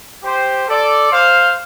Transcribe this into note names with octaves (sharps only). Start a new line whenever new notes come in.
G4 C5
A4 D5
C5 F5